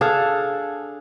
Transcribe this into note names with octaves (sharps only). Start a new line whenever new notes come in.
D4 G#4 A4 F5